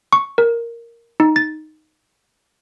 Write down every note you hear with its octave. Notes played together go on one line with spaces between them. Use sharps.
C#6
A#4
D#4
A6